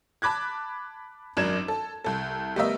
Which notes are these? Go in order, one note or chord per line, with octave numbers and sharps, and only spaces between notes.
A5 B5 D6 F#6 G#6
G#1 F#2 D4 A#4 G#6 E7
A4
C2 A4
G3 A3 B3 A#4 D#5 E5